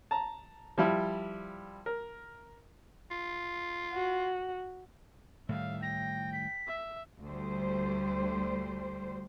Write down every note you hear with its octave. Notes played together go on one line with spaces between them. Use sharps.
A5 A#5
F3 G3 E4
A#4
F4
F#4
A2 D#3 G3 E5 F5
G5 A#6
B6
E5
D2 G3 C5